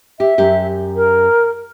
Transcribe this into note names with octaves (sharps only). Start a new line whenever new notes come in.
G4 E5
F#2 G4
A#4